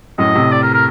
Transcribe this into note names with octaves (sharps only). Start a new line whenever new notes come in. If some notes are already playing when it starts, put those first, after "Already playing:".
F#2 A2 D#5
A2 C3
D5
A#4
A#4